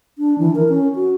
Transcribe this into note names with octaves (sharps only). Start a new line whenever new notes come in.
D4
E3
A#4
C#4
F#4